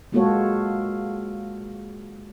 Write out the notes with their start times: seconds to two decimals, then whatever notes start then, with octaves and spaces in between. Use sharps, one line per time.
0.12 G#3 A#3 F4 F#4 A4 C#5